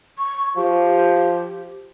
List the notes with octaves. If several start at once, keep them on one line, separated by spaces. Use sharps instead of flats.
C#6
F3 G4